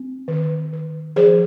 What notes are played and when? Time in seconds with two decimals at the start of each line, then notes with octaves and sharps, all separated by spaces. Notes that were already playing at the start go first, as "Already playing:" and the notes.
Already playing: C4
0.28 D#3
0.73 D#3
1.16 F3 G#4 C5